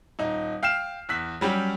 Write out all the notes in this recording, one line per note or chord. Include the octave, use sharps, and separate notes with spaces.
D#1 D#4
F5 G5 F6 C7 E7
E2 E6 F#6 B6
F#3 G3 C#4 G4